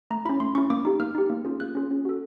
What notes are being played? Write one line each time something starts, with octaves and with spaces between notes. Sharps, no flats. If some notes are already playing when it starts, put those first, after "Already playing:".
A3 A#5
C#4 E4 B5
A3 C6
C#4 E4 C#6
A#3 D6
D#4 G4
A#3 F6
D#4 G4
A#3
C#4 F4 G#4
A#3 F#6
C#4 F4 G#4
C#4
F#4 A4